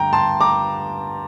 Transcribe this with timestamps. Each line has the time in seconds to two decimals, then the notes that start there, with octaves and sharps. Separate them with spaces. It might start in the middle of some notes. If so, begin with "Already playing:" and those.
Already playing: G2 D3 G5 A#5
0.13 A5 C6
0.41 A#5 D6